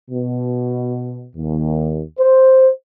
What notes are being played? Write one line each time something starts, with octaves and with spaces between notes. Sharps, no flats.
B2
D#2
C5